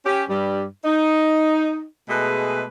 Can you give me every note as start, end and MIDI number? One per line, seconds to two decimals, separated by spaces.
0.06 0.23 61
0.06 0.23 67
0.28 0.64 43
0.28 0.64 55
0.85 1.84 63
2.09 2.64 47
2.09 2.64 56
2.09 2.64 57
2.09 2.64 68
2.09 2.64 71